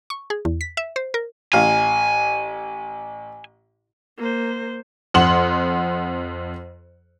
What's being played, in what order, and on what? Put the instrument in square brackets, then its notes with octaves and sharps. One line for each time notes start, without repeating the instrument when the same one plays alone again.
[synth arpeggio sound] C#6
G#4
E2
B6
E5
C5
A#4
[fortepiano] A1 F5 [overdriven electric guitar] G#5
[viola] A#3 C5
[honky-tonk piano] F2 F#5 C6 F#7